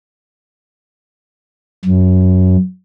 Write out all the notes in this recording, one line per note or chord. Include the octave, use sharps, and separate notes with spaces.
F#2